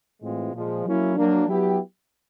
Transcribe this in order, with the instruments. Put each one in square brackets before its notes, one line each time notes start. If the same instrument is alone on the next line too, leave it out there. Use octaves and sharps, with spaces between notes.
[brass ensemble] A2 E3 G#3 C4 F4
A#2 F3 G#3
F#3 A#3 C#4 E4
F#3 A#3 D4
F#3 B3 E4 G4